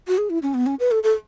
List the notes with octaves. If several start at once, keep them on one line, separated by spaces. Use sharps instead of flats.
F#4
G#4
E4
C#4
B3
C#4
B4
A4
A4